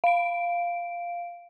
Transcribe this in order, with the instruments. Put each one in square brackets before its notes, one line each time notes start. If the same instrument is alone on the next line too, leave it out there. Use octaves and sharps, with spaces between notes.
[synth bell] F5 D7